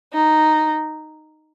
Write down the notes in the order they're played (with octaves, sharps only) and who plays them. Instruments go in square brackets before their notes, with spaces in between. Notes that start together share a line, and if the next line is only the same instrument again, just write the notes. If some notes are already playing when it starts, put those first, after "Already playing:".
[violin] D#4